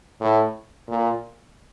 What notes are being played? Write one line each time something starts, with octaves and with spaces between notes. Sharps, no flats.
A2
A#2